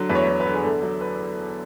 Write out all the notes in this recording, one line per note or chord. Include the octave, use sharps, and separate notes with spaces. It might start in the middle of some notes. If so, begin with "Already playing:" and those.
Already playing: D3 F#3
E2 B4
C#5
E2
B4
D3
G#4
E2 A4
F#3
B4